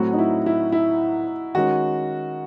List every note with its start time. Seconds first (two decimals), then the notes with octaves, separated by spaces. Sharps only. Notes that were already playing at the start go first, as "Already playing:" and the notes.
Already playing: A2 F#3 C4 F#4
0.13 D#4
0.19 E4
0.46 E4
0.72 E4
1.55 D#3 G#3 C#4 F#4